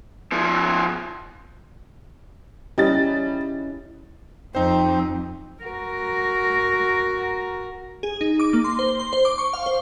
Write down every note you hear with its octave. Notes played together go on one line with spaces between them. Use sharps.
F3 B3
G3 C#4 E4 D#5 A6
F2 C4 D#4 C5
F#4 A#4
G#4
D#4
D6
A#3
C6
C5
C6
C5
D6
C#6
F5
C5